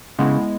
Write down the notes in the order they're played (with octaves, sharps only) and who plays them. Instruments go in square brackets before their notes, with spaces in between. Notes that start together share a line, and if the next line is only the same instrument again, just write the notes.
[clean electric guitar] C#3 [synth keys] G#3 B3 E4